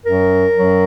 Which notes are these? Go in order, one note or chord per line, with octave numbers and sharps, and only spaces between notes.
F#2 F#3 A#4
F#2 F#3